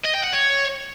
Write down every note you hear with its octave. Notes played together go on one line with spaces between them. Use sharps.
D#5
G5
F#5
C#5